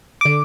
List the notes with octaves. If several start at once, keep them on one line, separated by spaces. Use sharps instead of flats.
D3 D6